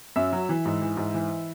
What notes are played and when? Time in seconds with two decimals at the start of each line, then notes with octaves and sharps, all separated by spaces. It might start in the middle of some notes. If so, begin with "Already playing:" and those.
0.16 F#2 E5
0.32 F#3
0.49 E3
0.65 G#2
0.82 E3
0.97 G#2
1.14 E3